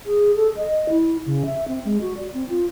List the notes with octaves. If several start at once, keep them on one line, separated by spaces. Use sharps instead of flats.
G#4
A4
D#5
E4
C#3
E5
C4
G#3
F#4
D5
C4
F4